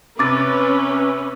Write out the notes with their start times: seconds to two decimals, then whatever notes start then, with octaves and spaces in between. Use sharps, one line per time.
0.19 C3 C#4 B4 D6 A6